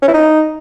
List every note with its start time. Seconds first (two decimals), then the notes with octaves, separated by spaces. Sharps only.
0.02 C#4
0.08 E4
0.14 D#4